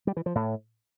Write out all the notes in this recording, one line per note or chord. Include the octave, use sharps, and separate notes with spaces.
G3
E3
F3
A2